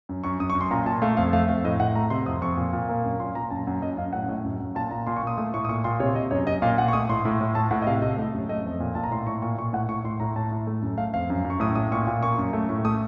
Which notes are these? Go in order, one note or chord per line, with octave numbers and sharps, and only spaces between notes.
F#2
F#2 C#6
F#2 D#6
C#6
F#2
C6
A#2 A#5
A#2 A5
A3 F5
F2 F5
A3 F5
F2 F5
A2 D#5
A2 F#5
A3 A#5
C3 C6
F2 D#6
F2 C#6
A#2
A#2
A#3
F#2
A#2 C6
A#2 A#5
F#2 A5
F#2 F#5
F#2 D#5
F#2 F5
A2 F#5
A2
F#2
F#2
A#2 A5
A#2 A#5
A#2 C6
C#6
A#2 D#6
A3 D#6
A2 C#6
D#6
A#2 C#6
A#2 C6
C3 C#5
C3 D#5
F#2 C#5
F#2 D#5
A#2 F5
A#2 F#5
C#6
A3 D#6
A2 C6
A2
A2
A2 A5
A2 F#5
D#5
C3 F5
C3 D#5
A3
F#2
A3 D#5
F2
A#2
A#2 A5
A#5
A2 C6
A2 C#6
A#2 C#6
A#2 C#6
A2 F#5
A2 C#6
A2 C6
A2 A#5
A2 A5
A2
A3
F#2
A3 F5
F2 F5
F#2
F#2
C#6
A2 D#6
A2 D#6
A#2 C#6
A#2
A#3 C#6
F#2
A3
A2
A3 D#6